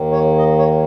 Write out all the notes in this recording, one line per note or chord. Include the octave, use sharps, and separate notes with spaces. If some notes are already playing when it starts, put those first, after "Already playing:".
Already playing: D#2 D#3 A#3
C#5
D#5
C#5